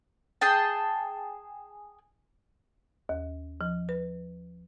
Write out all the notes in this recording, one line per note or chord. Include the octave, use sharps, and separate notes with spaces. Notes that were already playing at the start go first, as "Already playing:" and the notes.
G#4 G5 A5
D#2
F3
B4